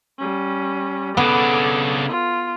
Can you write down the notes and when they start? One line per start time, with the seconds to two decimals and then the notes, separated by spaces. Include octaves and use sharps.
0.19 G3 C#4
1.17 C#3 B3 D4 A4 D6
2.08 F4